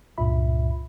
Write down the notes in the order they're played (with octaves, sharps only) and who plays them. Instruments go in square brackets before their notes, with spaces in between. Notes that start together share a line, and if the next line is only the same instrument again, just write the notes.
[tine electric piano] C#2 G2 A#2 F4 E5 B5